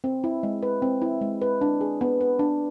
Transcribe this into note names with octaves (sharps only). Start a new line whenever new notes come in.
C4
E4
G#3
B4
C4
E4
G#3
B4
D4
G#4
B3
B4
D4